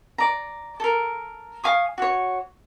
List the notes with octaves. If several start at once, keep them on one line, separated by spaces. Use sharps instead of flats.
D5 A#5
A4 A#4
F5 G#5 C#6 D#6
F#4 C#5